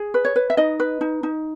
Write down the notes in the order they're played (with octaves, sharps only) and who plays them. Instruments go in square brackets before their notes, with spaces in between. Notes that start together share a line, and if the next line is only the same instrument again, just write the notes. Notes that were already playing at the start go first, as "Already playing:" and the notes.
Already playing: [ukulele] G#4
B4
C#5
B4
E5
D#4 D#5
B4
D#4
D#4